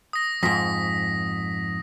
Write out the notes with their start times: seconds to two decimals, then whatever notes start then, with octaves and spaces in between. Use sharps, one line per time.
0.13 D#6 A#6
0.43 F2 G#2 D#6 A#6 B6